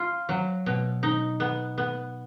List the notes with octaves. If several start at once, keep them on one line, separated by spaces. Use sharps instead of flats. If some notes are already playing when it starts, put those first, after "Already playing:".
Already playing: F4
F#3
B2
D#4
B3
B3